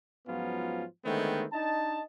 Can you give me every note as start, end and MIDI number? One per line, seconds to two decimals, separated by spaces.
0.28 0.84 44
0.28 0.84 53
0.28 0.84 54
0.28 0.84 59
0.28 0.84 61
0.28 0.84 65
1.05 1.44 50
1.05 1.44 51
1.05 1.44 56
1.05 1.44 57
1.05 1.44 59
1.05 1.44 60
1.53 2.01 62
1.53 2.01 63
1.53 2.01 75
1.53 2.01 81